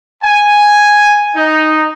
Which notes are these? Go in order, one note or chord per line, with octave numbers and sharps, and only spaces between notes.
G#5
D#4